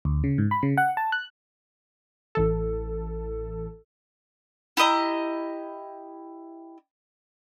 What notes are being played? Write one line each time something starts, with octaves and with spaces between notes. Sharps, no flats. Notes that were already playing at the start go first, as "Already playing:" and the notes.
D2
C#3
G#2
B5
C#3
F#5
A5
F#6
A1 E3 A4
E4 G4 D#5 A#5